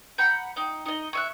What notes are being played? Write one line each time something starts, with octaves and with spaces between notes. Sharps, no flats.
F#5 A#5 B5 G6
D#4 G5
D#4 D#5
C#5 E5 F#6